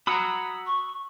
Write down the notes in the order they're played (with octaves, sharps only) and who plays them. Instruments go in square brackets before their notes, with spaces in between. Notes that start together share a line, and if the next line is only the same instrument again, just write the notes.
[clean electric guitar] F#4 F#5 A#5 [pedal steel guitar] B5 D#6 E6
[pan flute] C#6